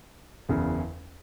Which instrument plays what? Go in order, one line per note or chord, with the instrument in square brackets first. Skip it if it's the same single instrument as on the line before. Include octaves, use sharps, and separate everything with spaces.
[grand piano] F#1 E2 C#3